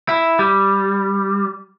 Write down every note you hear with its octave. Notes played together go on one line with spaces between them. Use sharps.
E4
G3